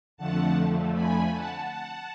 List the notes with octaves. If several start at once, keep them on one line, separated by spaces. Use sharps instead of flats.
F2 D3 F3 A3 F#5 A5
G#5 B5
F#5 A5
F#5 A5